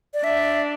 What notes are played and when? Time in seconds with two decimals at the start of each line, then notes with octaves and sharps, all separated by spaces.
0.14 D5
0.23 D4 E5